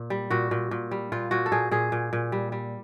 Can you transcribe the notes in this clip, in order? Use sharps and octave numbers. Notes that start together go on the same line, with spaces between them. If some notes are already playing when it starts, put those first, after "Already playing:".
Already playing: A#2
G3
A#2 F#4
A#2
A#2
G3
A#2 F4
A#2 F#4
A4
A#2 G#4
A#2 G#4
A#2
A#2
G3
G3